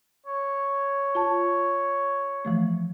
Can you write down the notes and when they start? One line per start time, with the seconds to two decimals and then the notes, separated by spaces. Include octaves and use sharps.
0.26 C#5
1.15 F4 A5
2.45 E3 F3 A3